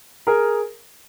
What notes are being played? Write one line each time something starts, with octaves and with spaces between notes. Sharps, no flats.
G#4 A#4